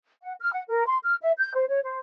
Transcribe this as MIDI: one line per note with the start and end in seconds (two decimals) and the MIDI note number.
0.22 0.33 78
0.40 0.50 89
0.52 0.63 78
0.69 0.84 70
0.86 0.98 84
1.03 1.15 89
1.22 1.32 76
1.38 1.53 91
1.55 1.64 72
1.69 1.82 73
1.83 1.99 72